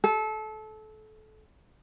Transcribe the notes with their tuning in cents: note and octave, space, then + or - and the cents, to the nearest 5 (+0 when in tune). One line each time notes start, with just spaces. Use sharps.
A4 -25